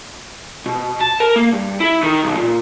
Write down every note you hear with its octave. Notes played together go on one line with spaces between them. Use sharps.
B2
A5
A#4
A#3
G2
E4
D#3
B1
A#2